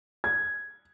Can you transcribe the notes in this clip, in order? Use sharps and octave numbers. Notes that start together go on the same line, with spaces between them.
G#6